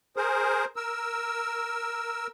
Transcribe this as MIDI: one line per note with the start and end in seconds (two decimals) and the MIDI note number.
0.17 0.65 68
0.17 0.65 70
0.17 0.65 72
0.76 2.27 70
0.76 2.27 88